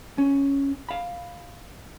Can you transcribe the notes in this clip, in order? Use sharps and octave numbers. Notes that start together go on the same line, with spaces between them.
C#4
F5 B5